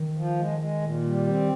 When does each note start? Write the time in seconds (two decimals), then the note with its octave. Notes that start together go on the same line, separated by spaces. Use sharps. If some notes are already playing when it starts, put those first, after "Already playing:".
Already playing: D#3
0.16 F3
0.37 G#3
0.59 G#3
0.81 A#2
1.03 G3
1.26 C4